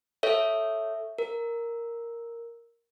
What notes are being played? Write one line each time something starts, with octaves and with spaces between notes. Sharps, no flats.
A4 C#5 E5
A#4